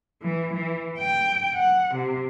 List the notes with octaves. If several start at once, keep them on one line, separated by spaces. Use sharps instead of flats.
E3
E3
G5
F#5
C3